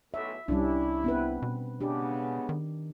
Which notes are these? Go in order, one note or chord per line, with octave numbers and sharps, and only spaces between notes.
B1 A2 E5
C2 G3 C#4 D4 E4
B3 C4 B4
B2
C#3 G#3 B3 D4 G4
D#3